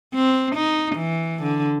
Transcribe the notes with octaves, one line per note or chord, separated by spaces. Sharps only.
C4
D#4
E3
D3